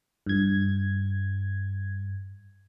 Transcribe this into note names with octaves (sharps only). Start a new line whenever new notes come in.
G2 G#6